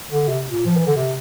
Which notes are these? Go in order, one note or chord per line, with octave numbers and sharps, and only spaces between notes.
D3
C3
A#2
F3
E3
D3
C3